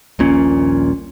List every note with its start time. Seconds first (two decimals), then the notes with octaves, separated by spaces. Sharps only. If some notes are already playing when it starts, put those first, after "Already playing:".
0.19 D#1 A#1 A#2 C#4